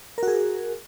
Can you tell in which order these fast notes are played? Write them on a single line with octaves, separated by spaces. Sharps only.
A#4 F#4 G#4